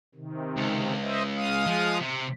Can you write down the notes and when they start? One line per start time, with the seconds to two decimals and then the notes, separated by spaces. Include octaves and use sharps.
0.15 C3 D#3
0.57 C#2
1.02 C5 D#5 E5
1.36 G#3 F5 D#6
1.66 F3
2.00 C3